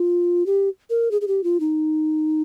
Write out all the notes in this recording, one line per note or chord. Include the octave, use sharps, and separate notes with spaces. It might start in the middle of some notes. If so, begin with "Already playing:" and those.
Already playing: F4
G4
A#4
G#4
G#4
G4
F4
D#4